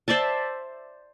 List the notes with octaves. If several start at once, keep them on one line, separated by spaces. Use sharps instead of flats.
C5 D5 E5 A5